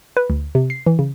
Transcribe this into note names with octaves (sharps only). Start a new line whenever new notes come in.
B4
D2
C3
C7
E3
C#3